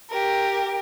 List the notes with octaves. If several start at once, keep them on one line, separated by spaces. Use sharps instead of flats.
G4 A#4